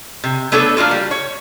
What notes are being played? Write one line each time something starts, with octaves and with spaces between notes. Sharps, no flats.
C3
A3 B3 D4 A4 C#5
A#3 D4 F4 F#4
G3
C#5